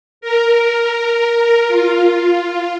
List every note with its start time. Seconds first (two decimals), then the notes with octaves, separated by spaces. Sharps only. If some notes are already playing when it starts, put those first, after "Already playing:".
0.21 A#4
1.68 F4